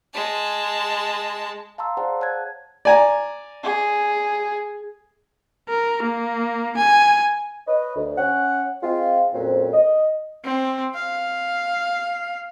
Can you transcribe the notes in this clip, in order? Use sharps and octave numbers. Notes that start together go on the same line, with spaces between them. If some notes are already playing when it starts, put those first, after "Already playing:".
G#3 A5
F5 A5 A#5 C6 E6
G#4 C5 D5 F5 F#5 A5
C#5 A5 F#6 G#6
D5 G#5 A#5
G#4
A#4
A#3
G#5
B4 C#5 D#5
D2
C#4 F#5
G#3 C4 F4
F2 A#2 F#3 C4 C#4
D#5
C4
F5